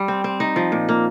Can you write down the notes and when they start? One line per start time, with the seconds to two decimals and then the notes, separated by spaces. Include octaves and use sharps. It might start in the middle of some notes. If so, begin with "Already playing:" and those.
Already playing: G3
0.08 C4
0.24 C4
0.40 D#4
0.56 F3
0.72 A#2
0.89 A#3